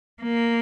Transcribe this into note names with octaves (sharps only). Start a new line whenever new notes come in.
A#3